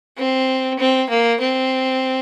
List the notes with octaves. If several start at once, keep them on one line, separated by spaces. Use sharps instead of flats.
C4
C4
A#3
C4